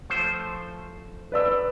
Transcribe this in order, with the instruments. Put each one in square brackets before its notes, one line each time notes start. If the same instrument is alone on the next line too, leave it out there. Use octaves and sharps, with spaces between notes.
[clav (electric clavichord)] F3 A3 C5
[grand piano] B4 D5 E6